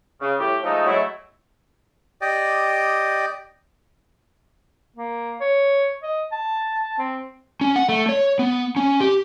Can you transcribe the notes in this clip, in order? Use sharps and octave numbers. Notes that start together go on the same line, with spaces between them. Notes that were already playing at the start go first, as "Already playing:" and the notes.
C#3
A2 G4
F3 G#3 A3 D#4
F#3 G#3 A3 E4
G4 D5 D#5 G5
A#3
C#5
D#5
A5
C4
C#4
F#5
A3
C#5
B3
C#4
G4